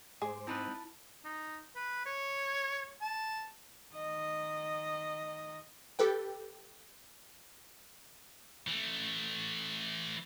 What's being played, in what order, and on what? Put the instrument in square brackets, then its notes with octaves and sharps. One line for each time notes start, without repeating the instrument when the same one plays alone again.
[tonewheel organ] G#2 C5 [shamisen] G#4 [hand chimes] D6
[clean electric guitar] C4 D#4 B4 [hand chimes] E4 A5 B5
[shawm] D#4
B4
C#5
A5
[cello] D#3 D#5
[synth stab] G4 A4 B4 G5
[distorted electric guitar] E3 A3